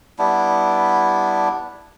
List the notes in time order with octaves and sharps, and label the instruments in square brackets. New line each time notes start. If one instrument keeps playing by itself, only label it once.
[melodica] G3 B3 D4 E4